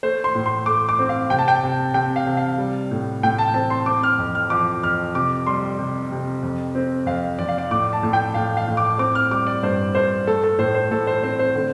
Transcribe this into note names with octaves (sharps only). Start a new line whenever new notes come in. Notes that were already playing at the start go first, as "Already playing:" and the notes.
A3 C5
C6
A2
C6
A3 D6
D6
C4
F5
C3 G5
A5
G5
C3
C3 G5
F5
C3
F5
G3
A2
A2 G5
A5
C4 A5
C6
C4 D6
F6
F2
F6
F3 D6
F2 F6
C3 D6
G3 C6
C3
C3
F2
C4
F2 F5
F2 D5
F5
D5
A2 D6
A5
A2
G5
A2 F5
F5
A2
D6
C4 D6
F6
G3 D6
D5
G2 C5
G2 C5
A3 A4
A4
A2 C5
C5
A2 A4
C5
C4 C5
C5
D3